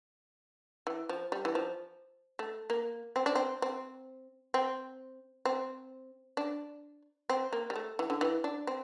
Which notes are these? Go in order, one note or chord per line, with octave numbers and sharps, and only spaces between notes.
E3
F3
G3
E3
F3
A3
A#3
C4
D4
C4
C4
C4
C4
D4
C4
A#3
G3
A3
E3
D3
E3
D4
C4